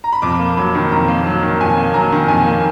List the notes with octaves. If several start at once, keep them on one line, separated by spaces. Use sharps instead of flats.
A#5
B5
F2 D6
A#3
F#3 B5
D#3
F2 A#5
A#3
F#3
D#3
F2 G#5
A#3
F#3 A#5
D#3
F2 G#5
A#3